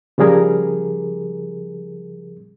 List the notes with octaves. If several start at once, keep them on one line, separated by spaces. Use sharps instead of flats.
C#3 F3 G3 G#4 A#4